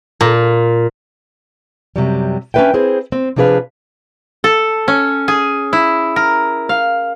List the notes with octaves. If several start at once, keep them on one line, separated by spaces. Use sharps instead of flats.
A#2
F#2 C3 F#3 G3
C#4 D4 F#4 B4 E5 G5
C4 E4 G#4 C5
C4
C3 F3 D4 G#4 B4 F5
A4
C#4
G#4
E4
A#4
F5